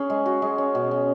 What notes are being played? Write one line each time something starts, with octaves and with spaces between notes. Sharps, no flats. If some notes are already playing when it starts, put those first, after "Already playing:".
Already playing: C#4 G#4
G#3
F#4
G#3
C#4
B2
C#4